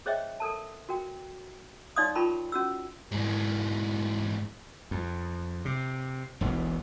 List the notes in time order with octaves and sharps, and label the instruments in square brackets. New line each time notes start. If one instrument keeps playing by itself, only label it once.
[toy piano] G#4 C5 C#5 D#5 E5 G5
A4 A#4 A5
F#4 A#4 G5
D#4 C#5 D5 F5 C6 D#6
F4 A#4 G5 A5 B5 C#6
C#4 F#4 E6
[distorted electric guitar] G#2 E3
[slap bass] F2
C3
E1 B1 E3